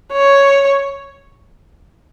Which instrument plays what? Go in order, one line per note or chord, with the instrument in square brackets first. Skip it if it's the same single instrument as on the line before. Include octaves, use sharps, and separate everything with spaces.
[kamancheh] C#5